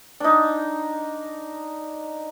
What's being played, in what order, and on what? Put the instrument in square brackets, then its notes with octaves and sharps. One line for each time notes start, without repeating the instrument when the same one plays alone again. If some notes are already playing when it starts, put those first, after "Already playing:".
[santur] D4 D#4